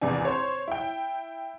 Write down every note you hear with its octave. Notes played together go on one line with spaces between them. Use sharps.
G#1 E2 C3 D4 G#5
C5 C#5
E4 G5